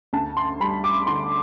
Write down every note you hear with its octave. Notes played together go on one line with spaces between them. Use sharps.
D2 A5
C6
G3 B5
D6
D3 C6